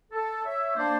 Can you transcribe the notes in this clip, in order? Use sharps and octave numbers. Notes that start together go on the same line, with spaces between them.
A4
C#5 E5
A#3 D4 C5 D5